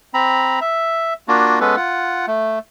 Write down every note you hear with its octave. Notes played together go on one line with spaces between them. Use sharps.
C4 A#5 B5
E5
A#3 D4 F4 F#4
G#3 B3 C#4 A4 B4
F4 F#5
A3